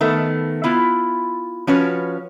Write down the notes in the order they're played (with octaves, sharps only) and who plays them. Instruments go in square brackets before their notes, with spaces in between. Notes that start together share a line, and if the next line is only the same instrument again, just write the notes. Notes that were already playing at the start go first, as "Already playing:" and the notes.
[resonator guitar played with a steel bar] D#3 A3 B3
B3 E4 F4
F3 C#4 F#4 B4 C#5